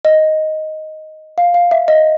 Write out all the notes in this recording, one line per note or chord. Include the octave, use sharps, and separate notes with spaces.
D#5
F5
F5
E5
D#5